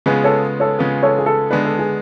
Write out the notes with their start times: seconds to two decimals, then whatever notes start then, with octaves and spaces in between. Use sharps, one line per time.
0.06 C#3 G#3 B3 F4 G#4 B4
0.24 A4 C#5
0.60 A4 C#5
0.79 C#3 G#3 B3 F4
1.03 A4 C#5
1.18 G#4
1.26 A4
1.51 D3 G#3 B3 D4 B4
1.65 A4
1.79 G#4